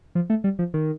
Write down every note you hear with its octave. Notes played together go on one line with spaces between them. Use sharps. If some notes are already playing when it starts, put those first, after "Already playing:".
F3
A3
G3
F3
D#3